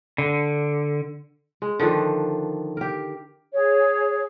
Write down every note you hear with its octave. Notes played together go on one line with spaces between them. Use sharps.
D3
G#3
D3 D#3 F3 D4
G4 A#4
G#4 C#5